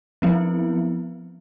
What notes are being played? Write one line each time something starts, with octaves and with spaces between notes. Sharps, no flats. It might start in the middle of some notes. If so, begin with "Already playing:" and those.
F3 F#3 B3 C4 E4